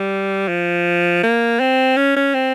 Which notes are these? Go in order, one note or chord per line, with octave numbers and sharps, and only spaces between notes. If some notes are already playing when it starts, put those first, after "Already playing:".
Already playing: G3
F3
A#3
C4
C#4
C#4
C4